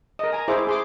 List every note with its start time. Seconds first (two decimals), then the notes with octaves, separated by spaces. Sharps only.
0.19 A#4 D#5
0.33 G#5 A#5
0.48 E4 G#4 C5 E5 D6
0.67 G#4 C6 D6